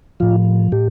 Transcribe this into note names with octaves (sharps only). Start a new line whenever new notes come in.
A2 F3 F4
A2 G4